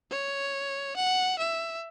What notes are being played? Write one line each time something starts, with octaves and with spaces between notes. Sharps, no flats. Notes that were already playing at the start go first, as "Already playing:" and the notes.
C#5
F#5
E5